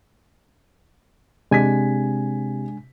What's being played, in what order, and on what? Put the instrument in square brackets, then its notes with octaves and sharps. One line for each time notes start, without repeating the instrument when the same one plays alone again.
[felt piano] C3 B6 [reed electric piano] G#3 D4 G#5